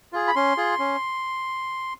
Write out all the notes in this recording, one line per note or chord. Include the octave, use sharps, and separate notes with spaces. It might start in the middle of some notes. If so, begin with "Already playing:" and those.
F4 G#4
B5
C#4 C6
F4 G#4
C#4